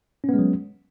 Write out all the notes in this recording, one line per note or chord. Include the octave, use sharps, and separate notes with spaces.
F#3 G#3 B3 C#4